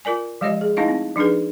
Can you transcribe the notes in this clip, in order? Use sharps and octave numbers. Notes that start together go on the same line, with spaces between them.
F4 A#4 D5 G#5
F3 G#3 G4 C#5 D#5
G#4
A3 C#4 D#4 E4 D#5 F5
C4
F3 D4 D#4 G#4 B4